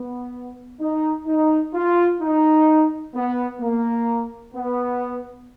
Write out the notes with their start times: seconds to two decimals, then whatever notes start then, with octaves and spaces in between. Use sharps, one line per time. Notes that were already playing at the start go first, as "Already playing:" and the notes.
Already playing: B3
0.81 D#4
1.27 D#4
1.74 F4
2.21 D#4
3.15 B3
3.61 A#3
4.54 B3